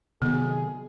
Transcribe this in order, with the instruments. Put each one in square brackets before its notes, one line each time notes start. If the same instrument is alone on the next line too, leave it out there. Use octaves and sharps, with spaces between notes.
[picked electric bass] C3 D#3 F#3 [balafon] B3 [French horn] G#4